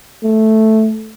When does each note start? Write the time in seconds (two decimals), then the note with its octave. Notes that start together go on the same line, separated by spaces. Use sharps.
0.23 A3